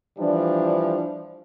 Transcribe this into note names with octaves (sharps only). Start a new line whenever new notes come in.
E3 F3 G3 D4